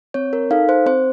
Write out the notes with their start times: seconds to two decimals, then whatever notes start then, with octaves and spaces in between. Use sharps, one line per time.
0.14 C4 C#5
0.33 A#4
0.51 D#4 A4 F5
0.69 C5
0.86 C4 C5